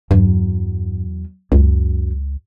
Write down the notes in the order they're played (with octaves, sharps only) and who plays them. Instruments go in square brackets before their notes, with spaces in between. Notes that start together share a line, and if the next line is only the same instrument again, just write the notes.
[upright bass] E2 F#3 [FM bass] G2
[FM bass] C#2 [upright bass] F#2